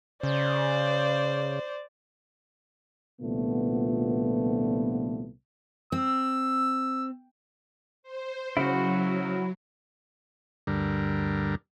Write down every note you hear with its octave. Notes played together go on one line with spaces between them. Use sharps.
C#3 C5 D5
C2 A#2 D3 F3 A3 B3
C4 E6
C5
C#3 F#3 E4 F#4
D2 G2 D3 G3 A#4